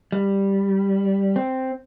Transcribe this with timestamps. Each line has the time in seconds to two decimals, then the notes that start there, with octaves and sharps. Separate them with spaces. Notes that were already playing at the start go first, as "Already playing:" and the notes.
0.12 G3
1.36 C4